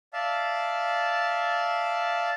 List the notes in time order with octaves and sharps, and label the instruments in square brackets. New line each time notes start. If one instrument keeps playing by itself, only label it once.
[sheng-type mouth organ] D5 E5 F5 A5